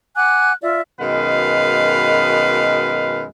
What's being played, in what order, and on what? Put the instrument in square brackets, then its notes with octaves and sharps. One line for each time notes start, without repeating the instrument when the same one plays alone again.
[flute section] F#5 G#5 D6 F#6
F4 D5 E5
[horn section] F#2 B2 D#3 G#3 B4 F5